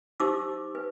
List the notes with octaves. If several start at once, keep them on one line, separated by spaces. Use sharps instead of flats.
D#4 G4 C5 D6 E6
B4